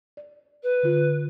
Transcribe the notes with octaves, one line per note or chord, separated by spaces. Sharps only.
D5
B4
D3 F4